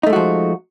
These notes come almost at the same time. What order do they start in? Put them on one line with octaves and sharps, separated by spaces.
D#4 A3 G#3 F#4 F3